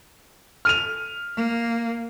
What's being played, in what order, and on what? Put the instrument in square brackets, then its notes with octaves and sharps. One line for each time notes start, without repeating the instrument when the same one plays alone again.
[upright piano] F6 D#7 F7
[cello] A#3